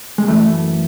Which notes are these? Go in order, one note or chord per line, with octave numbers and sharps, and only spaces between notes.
G#3
F#2 E3 A3